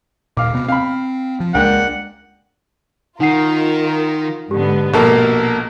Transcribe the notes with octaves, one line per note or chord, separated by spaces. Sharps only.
D#1 A#2 F5 D6
C3 B3
C4 F5 B5
F3
C#2 G#3 A#3 D4 F#5 G5
D#3 D#4 F4 A#4 F#5 C7
G#2 D3 B3 G4
A#1 B2 A#3 A4 A#4